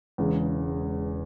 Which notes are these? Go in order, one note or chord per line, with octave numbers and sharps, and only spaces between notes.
E1 E2 C#3 G#3